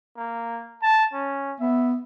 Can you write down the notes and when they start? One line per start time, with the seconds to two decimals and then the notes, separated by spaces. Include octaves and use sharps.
0.17 A#3
0.82 A5
1.13 C#4
1.60 B3 E5